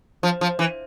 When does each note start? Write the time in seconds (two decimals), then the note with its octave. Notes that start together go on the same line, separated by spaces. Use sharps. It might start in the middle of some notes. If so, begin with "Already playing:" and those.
0.23 F3
0.41 F3
0.59 E3